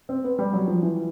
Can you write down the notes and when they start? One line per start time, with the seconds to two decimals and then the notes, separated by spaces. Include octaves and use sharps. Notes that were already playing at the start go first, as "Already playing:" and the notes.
0.09 C4
0.24 B3
0.39 G3
0.53 F#3
0.68 F3
0.83 E3